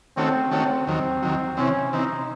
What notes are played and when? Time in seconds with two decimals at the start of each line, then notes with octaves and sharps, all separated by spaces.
0.17 D#3 A3 C4 C#4 F#4 A4
0.51 D#3 A3 C4 C#4 F#4 A4
0.87 D#2 D#3 F#3 C4
1.23 D#2 D#3 F#3
1.57 C3 E3 C4 C#4
1.93 C3 E3 C4 D#4